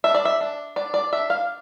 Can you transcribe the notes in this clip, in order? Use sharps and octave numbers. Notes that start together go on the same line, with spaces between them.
D4 E5
D5
E5
D4
D4 D5
D5
D4 E5
F5